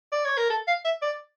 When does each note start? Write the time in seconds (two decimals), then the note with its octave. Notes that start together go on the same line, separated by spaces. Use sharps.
0.12 D5
0.25 C#5
0.38 A#4
0.50 A4
0.68 F5
0.85 E5
1.02 D5